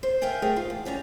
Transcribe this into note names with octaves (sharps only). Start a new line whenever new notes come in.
C5
A#4 E5 F5 G5 G#5
A3 G#4 A#4 E5 G5
G#2 F4 F5
E2
G3 C#4 D4 A#5